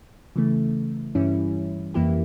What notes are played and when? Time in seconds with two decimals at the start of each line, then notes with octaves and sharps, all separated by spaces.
0.36 C#3 E3 A3
1.15 G2 E3 G3 C#4 E4
1.94 F2 E3 A#3 E4 G4